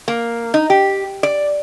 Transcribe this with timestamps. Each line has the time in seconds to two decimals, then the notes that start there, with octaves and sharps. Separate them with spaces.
0.08 A#3
0.54 D#4
0.70 G4
1.23 D5